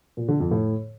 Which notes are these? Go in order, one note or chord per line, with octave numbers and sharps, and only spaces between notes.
A#2
D3
F2
A2